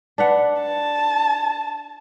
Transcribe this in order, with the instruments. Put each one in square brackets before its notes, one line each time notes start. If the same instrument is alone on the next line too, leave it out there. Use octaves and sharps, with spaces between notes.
[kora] D4 B4 F#5
[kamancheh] A5